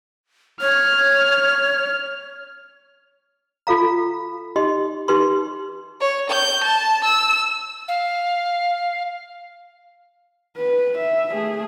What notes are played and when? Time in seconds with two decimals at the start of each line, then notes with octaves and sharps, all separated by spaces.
0.61 C#5 F6
3.67 F4 A4 F5 A#5
4.56 D#4 G4 D#5 C6
5.08 D#4 G4 B4 C6
6.01 C#5
6.30 G6
6.64 A5
7.05 E6
7.88 F5
10.57 B4
10.98 E5
11.33 A3 G#4